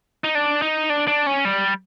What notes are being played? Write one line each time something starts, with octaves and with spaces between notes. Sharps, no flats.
D#4
D4
D#4
D4
D4
C#4
G3